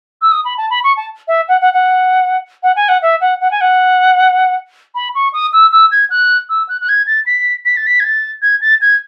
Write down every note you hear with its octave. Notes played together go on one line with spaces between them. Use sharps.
E6
D#6
B5
A5
B5
C#6
A5
E5
F#5
F#5
F#5
F#5
G#5
F#5
E5
F#5
F#5
G#5
F#5
B5
C#6
D#6
E6
E6
G#6
F#6
E6
F#6
F#6
G#6
A6
B6
B6
A6
B6
G#6
A6
G#6
A6
G#6